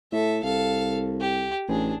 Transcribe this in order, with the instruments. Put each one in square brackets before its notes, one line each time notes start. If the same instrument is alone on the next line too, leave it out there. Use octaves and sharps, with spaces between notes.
[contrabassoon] A2 [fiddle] A4 E5
[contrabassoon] C2 [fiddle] A4 F5
[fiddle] G4
[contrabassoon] A1 [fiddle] D4 G#4